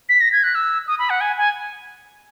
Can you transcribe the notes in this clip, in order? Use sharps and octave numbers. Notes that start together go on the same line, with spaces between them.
B6
A#6
G#6
F#6
E6
D#6
B5
F#5
G#5
G#5